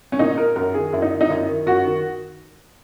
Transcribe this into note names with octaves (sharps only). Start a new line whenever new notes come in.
C#4
A#2 D#4
A#4
F#2 A#4
D#3 G#4
F#2 E4
D#4
D#3
D#4
F#2 E4
D#3
F#2 F#4
D#3